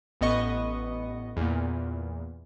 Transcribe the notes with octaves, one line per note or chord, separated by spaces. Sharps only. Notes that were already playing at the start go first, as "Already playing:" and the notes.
A1 B3 D#5 C#6
E2 A#2